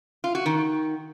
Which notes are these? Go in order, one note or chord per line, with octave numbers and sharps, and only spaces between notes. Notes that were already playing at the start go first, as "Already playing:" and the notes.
F4
F#4
D#3